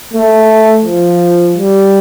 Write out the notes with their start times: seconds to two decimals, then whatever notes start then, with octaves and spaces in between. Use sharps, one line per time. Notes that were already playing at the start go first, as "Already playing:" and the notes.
0.13 A3
0.83 F3
1.54 G3